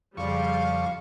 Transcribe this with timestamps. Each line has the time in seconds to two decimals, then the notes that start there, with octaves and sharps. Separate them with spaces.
0.17 F2 C#3 G3 F5 C#6